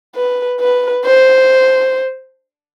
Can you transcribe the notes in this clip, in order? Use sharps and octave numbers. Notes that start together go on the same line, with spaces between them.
B4
B4
C5